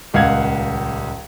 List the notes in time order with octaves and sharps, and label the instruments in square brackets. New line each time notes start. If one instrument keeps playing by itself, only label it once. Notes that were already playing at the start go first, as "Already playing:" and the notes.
[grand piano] D#1 C#2 F5 F#5 G#6